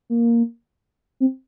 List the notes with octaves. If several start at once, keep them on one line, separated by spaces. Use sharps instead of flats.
A#3
C4